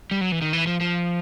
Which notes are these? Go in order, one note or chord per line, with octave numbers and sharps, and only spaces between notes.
G3
F#3
E3
D#3
E3
F3
F3